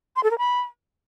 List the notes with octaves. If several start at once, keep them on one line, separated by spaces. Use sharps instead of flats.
C6
A4
A#4
B5